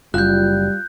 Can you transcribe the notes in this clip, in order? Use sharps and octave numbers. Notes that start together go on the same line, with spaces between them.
F#1 G3 F4 F#6 G6